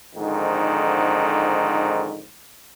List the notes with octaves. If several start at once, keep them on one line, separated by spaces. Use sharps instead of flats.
F2 G#2 D3 D#3